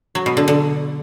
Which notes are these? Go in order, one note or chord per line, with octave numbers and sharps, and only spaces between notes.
F#3
B2
D3
D3